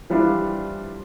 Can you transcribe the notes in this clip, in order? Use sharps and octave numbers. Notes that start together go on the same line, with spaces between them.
E3 F3 G3 D4 F4